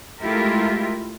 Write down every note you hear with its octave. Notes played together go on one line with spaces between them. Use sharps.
G#3 A3 E4 F4 G4 A#4